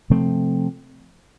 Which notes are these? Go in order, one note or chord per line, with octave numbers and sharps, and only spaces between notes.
C3 F3 A3 C4